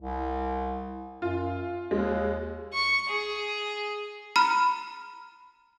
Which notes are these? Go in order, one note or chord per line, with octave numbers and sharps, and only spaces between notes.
C2
F#2 F4
D#2 G#3
C#6
G#4
A#5 B5 F6